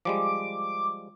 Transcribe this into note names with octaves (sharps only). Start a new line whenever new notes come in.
F3 G3 G#3 D6